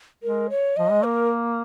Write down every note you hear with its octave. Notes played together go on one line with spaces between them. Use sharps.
G#3 A#4
C#5
F3 D#5
G#3
A#3 A#4